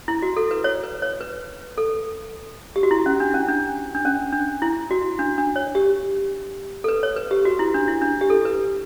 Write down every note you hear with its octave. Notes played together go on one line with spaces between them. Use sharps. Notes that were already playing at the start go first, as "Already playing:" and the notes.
E4
F#4
A4
B4
C#5
B4
C#5
B4
A4
G4
F#4
E4
C#4
D4
C#4
D4
D4
C#4
D4
E4
F#4
D4
D4
C#5
G4
A4
B4
C#5
B4
G4
F#4
E4
D4
E4
D4
G4
A4
B4